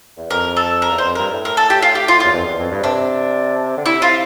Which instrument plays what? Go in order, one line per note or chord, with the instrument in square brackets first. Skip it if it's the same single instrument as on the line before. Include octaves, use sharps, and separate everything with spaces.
[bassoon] E2
[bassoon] F2 [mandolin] A#4
[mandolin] A4
A#4
[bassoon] E2
[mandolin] C5
[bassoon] F2
[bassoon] G2 [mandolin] A#4
[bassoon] A2
[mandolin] A#4
A4
G4
F4
G4
F4
F4
[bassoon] E2
F2
E2
F2
G2
[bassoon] C3 [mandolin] D4
[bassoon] D3
[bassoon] C3 [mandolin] E4
[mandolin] F4